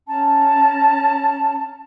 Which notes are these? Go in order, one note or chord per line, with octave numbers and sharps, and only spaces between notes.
C#4 A5 A#5